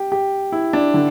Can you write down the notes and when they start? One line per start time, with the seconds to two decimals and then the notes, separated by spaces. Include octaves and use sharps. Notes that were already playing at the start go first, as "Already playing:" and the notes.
Already playing: G4
0.12 G4
0.52 E4
0.73 D4
0.94 D3